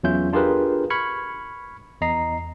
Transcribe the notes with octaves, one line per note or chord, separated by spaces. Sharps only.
E2 F#3 C#4 F4 E5 G6
D4 F4 G4 G#4 A#4 B4
B5 C#6 F6 G#6 C#7
E2 D#5 A#5 C7